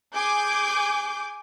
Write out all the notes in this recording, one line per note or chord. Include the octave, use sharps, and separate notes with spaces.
G#4 G#5 D6 G6